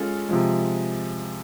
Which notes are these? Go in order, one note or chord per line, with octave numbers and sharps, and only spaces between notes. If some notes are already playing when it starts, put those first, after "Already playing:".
Already playing: G#3 C#4 F4 A4
C3 F3 G#3